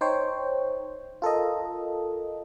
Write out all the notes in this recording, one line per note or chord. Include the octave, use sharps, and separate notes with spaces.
D#4 C5 C#5 G5
F4 A4 A#4 D#5